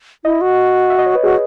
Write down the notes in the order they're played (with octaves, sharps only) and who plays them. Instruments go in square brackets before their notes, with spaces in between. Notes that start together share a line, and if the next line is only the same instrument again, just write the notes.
[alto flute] E4 [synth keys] D#5
[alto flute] F#4
[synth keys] E5
D#5
C#5
B4
[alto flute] F#4 [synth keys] G#4